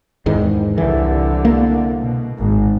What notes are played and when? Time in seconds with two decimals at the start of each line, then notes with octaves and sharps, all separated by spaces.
0.26 E2 G#2 D#3
0.78 C2 D3 E3
1.45 A#3
2.00 B2
2.39 G#1